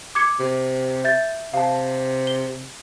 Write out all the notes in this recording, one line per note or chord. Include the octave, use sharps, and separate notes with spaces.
D6 G#6 C#7
C3
E5 G6 A6
C3 F5 A5
G7